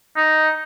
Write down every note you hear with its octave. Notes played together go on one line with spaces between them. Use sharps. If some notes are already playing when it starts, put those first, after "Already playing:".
D#4